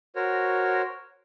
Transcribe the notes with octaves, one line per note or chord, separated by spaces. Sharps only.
F#4 A#4 C5 C#5